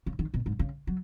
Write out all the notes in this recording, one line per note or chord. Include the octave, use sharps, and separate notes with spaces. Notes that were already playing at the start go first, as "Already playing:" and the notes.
C#3
D#3
B2
G#2
C#3
F#3